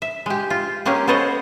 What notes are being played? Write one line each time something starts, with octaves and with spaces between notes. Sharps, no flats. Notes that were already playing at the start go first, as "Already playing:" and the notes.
E5
G#3 G4
F4
G#3 A#3 C#4 G4 G#4 A#4
B3 A4 C5 C#5 D#5 F#5